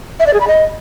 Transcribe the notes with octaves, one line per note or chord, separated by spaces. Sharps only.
E5
D5
G#4
B5
D#5